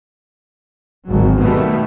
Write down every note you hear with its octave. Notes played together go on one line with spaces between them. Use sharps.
G#1 D2 G#2 F#3
B2 D#3 G3 A3 B3